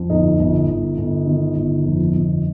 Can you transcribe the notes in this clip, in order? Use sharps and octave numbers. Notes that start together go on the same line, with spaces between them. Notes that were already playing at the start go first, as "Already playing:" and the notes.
Already playing: F2
G1 D#4
G1
G1
G1
D#3
G1
F2
G1